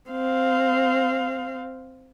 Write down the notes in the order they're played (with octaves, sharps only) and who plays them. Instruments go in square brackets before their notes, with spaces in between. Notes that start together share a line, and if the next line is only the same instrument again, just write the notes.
[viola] C4 F5